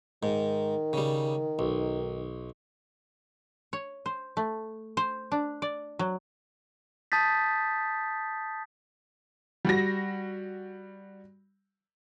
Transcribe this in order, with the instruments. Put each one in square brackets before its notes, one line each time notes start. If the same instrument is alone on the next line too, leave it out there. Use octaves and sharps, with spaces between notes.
[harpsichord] G#2 [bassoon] D#3
[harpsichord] C#3 G3
B1
[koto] C#5
C5
A3
C5
D4
D5
F#3
[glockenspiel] A5 D#6 G6 A6 B6
[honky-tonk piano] G3 F#4 A#6